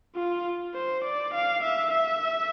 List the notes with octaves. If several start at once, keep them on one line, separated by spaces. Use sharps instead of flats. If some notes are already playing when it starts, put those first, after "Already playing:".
F4
C5
D5
F5
E5
E5